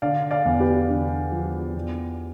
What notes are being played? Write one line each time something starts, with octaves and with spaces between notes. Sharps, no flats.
D3 D5 F5
D5 F5
E2
G4 B4
D3
F3
E2